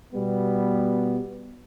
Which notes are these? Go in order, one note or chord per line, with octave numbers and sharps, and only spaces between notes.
B2 G3 B3